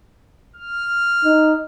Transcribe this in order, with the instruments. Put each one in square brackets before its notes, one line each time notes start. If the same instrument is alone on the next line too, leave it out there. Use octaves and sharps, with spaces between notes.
[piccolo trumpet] F6
[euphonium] D#4